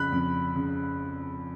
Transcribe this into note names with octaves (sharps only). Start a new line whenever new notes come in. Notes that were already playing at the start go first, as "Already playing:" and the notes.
Already playing: F2 C#3 B5 F#6
F2
C#3